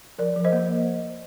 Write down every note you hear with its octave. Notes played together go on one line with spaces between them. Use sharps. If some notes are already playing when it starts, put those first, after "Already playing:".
F3 A#4 D5
F3
C5 D#5
A#3